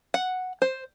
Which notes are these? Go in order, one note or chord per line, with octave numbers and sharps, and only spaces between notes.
F#5
C5